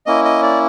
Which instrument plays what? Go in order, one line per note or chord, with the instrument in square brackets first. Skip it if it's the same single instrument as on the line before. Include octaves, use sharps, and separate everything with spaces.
[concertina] A#3 C#4 E4 D#5
D#5
D5